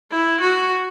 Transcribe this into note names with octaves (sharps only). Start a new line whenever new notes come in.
E4
F#4